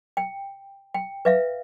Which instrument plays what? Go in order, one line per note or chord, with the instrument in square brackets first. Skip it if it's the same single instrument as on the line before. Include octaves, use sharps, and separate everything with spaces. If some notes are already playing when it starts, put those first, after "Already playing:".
[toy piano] G5
G5
B4 E5 F5